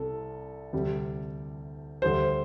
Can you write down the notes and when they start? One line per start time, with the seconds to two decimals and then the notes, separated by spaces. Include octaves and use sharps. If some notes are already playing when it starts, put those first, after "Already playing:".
Already playing: C2 C3 A4
0.73 D2 C3 G3
2.02 D2 D3 G3 C5